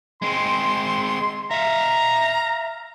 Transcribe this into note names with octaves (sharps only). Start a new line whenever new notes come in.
G#3 C4 C6
E5 F5 A#5